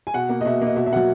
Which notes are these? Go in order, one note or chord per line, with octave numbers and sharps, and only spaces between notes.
G#5
B2 F#5
A#3
D#5
B2 E5
A#3 D#5
B2 E5
E5
F#3 A#3 F#5